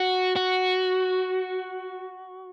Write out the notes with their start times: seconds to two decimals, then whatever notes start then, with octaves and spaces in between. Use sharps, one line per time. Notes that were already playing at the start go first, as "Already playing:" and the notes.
Already playing: F#4
0.36 F#4